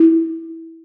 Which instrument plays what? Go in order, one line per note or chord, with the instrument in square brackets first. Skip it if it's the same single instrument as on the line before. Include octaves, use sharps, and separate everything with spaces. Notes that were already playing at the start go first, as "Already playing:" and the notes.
Already playing: [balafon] E4